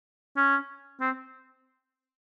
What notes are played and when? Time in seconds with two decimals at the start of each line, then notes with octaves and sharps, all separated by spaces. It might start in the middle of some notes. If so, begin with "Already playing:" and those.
0.37 C#4
1.00 C4